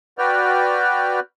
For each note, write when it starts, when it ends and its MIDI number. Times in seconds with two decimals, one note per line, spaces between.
0.18 1.20 66
0.18 1.20 71
0.18 1.20 74
0.18 1.20 79
0.18 1.20 89